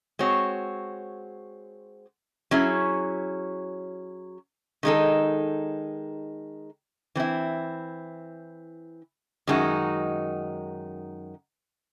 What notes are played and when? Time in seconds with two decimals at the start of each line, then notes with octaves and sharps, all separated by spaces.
0.19 G#3 C4 F#4 C#5
2.51 F#3 C#4 E4 G#4
4.83 D#3 G#3 D#4 A4
7.15 E3 C4 E4
9.47 F#2 D#3 G#3 D#4 F#4